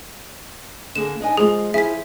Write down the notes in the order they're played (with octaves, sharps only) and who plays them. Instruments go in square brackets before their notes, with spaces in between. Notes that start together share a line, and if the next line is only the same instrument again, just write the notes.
[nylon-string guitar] D3 A#3 G#4 [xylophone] E7
[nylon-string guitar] D4 D#4 G#5
[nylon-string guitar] F3 G#3 F4 [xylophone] G#4
[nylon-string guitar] F3 E4 G#4 [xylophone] E5 B6